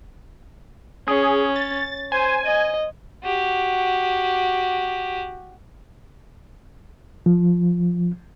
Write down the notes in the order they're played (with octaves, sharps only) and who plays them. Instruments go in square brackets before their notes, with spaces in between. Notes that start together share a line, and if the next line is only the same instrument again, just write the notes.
[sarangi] C#4 [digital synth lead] G#4
[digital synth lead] A6
[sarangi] C5 [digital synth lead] G#5
[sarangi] D#5
[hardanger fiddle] F#4 G4
[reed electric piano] F3